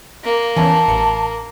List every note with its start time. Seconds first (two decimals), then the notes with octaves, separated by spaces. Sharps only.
0.24 A#3
0.56 E2 E3 C#4 A5
0.88 A1 C#7